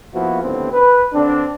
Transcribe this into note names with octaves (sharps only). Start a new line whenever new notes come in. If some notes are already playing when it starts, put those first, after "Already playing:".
F3 A#3 B3 E4 F#4
D#2 A2 D3 B3 C4
B4
D3 C4 D4